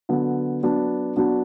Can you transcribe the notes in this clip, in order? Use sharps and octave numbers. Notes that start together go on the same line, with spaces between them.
D3 F#3 B3
F#3 B3 D4
F#3 B3 D4